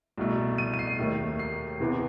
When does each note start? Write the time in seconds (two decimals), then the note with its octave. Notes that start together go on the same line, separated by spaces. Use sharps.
0.18 C2 B2 A3
0.58 D#7
0.74 D#7
0.79 C7
0.99 D#2 D#3 A3
1.39 C7
1.80 E2 C3 E3 B3